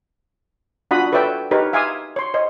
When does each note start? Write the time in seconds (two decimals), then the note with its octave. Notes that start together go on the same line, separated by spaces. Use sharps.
0.91 D4 F4 F#4 F#5 B5 D#6
1.12 A4 B4 C#5 D5 E5 G5
1.51 D#4 G4 A#4 B4 C#5
1.73 E5 F5 G#5 C6 D6 D#6
2.16 C#5 C6
2.34 C5 C#5 D#5